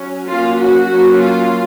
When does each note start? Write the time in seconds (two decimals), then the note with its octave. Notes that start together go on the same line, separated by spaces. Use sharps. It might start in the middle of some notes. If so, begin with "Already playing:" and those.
Already playing: F#3 C#4
0.29 F#3 A#3 C#4 F4
0.60 F#4
0.89 F#3 A#3 C#4
1.19 F4